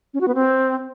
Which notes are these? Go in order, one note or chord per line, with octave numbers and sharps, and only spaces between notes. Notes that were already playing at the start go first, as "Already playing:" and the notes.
C#4
F#4
B3
C4